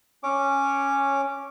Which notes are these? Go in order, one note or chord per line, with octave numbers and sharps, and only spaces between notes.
C#4 C#5 D6